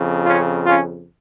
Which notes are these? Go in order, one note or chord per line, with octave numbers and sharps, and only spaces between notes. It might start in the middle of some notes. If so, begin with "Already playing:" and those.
Already playing: F2 C#3
C#4 F4
C#4 F4